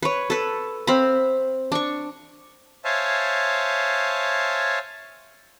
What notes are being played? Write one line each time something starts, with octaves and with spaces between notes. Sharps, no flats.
B4 C#5
A4 B4
C4 F5 B5
D4 C#6
C5 C#5 E5 F5 G#5 A5